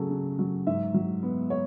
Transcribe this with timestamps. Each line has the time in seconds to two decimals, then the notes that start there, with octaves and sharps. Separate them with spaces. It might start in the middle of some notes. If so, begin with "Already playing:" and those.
Already playing: C#3 F#3 A3 F#4 G#4 A4
0.10 C#3
0.39 F#3
0.67 G#2 E5
0.94 F#3
1.23 B3
1.50 C#5